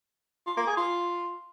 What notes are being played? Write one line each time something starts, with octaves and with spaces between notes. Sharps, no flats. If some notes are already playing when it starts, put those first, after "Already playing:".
F4
A#3
G#4
F4